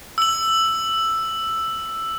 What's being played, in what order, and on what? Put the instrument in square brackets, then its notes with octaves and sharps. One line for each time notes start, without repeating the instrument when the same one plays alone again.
[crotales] E6 F#7